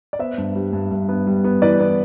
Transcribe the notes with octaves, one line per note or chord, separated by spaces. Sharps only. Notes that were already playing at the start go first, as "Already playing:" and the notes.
D5
B3 C5 E5
G2
G3
G2
G2
B3
G3
B3
E3 B4 D5
B3